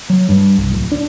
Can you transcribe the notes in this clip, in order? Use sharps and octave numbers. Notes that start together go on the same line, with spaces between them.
F#3
G2
C2
D1
D4